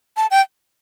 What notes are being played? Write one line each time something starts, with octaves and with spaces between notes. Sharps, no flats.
A5
G5